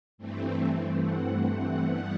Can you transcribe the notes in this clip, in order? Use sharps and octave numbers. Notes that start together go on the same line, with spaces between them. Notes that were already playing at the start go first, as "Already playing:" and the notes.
G2 E3 A3 C4
F#5
G2 E3 G3 B3 F#5